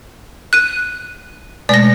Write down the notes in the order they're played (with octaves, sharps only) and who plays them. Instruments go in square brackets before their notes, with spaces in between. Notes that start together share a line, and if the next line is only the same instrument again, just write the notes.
[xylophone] F#6 D#7
[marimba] B2 G#3 A3 [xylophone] D5 A#6